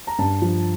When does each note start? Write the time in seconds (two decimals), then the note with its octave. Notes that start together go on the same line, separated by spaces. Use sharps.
0.07 A#5
0.19 G2 A5
0.42 F3